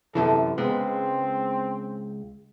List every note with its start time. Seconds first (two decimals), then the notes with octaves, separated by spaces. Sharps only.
0.15 F#2 C3 E3 A4
0.58 C#2 G#3 B3 C4